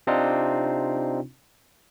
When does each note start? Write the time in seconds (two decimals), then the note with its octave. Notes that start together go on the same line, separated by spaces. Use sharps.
0.07 C3 C4 D4 D#4 F4